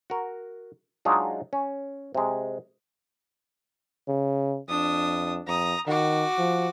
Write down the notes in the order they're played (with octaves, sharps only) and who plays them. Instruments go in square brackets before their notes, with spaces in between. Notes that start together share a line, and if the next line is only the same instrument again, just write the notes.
[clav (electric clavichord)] F#4 A#4
F#3 G#3 D4 D#4 F4
C#4
C3 G#3
[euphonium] C#3
[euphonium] F2 [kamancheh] D4 D#6
[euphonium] F2 [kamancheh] A#5 D#6
[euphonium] D#3 [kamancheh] F#4 D6
[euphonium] F3